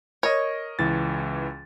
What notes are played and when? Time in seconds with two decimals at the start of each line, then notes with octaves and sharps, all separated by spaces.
0.23 A#4 C#5 D#5
0.79 C#2 E3 A6